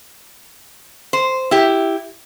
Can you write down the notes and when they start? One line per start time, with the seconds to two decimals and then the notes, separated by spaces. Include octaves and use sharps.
1.13 C5
1.51 E4 G4